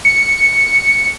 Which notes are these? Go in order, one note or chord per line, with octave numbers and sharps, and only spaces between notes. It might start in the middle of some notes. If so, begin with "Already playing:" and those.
C#7